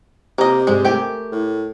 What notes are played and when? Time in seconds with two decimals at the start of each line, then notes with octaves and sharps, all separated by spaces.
0.38 C3 A#3 D#5
0.67 G#2 G#3 G#4 D5
0.85 A3 G4 A#4 G5 G#5
1.32 A2